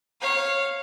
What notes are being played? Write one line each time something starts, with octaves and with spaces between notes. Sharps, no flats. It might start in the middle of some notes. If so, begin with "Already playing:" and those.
C#5 F5